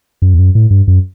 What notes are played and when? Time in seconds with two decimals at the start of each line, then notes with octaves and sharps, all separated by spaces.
0.22 F#2
0.34 E2
0.39 F#2
0.55 A2
0.70 G2
0.87 F#2